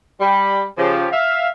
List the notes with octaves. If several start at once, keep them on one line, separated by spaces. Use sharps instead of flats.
G3 B5
C#3 F3 G4
E5 F5